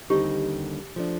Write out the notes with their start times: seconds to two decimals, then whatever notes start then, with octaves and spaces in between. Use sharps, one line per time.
0.10 D#2 D3 G3 C4 D#4 G4
0.96 F3 A3 D4